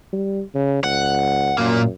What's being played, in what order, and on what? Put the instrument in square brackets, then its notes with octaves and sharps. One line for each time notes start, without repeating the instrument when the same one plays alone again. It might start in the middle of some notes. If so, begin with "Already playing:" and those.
[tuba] G3
C#3
[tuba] C#2 [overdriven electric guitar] F#5
[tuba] F#2 [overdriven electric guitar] A#2 A#3